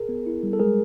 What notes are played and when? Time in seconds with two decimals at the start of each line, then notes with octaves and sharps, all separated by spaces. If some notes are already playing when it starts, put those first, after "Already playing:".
Already playing: G#4 A#4
0.09 B3
0.26 E4
0.43 G3
0.53 A4
0.59 G#3 G#4 A#4